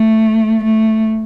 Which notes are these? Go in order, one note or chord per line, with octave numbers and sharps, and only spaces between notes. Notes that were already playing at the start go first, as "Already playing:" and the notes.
Already playing: A3
A3